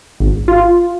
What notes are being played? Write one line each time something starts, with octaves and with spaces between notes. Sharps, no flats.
G#1
F4